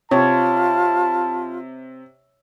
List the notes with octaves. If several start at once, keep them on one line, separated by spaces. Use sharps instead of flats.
C3 F4 C#5 A5